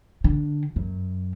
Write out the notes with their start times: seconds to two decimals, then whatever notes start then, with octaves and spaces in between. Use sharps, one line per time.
0.24 D3
0.76 F#2